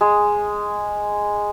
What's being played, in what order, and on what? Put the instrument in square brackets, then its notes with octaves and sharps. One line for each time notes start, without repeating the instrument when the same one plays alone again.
[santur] G#3